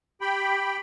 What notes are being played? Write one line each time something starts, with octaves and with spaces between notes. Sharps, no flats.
G4 G5 B5